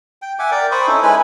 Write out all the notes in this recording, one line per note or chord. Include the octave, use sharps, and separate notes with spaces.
G5
E5 F#5 G#5 D6
A#4 D5 G5
C5 B5 C#6 D#6
C#4 D#4 E4 A4
G#3 E4 B4 G#5